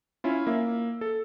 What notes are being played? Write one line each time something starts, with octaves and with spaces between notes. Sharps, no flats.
C#4 E4 F4
A#3 E5
A4